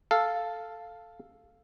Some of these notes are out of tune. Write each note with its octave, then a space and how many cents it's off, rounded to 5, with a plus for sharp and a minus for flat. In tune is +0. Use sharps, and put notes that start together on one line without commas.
A4 +0 F5 +0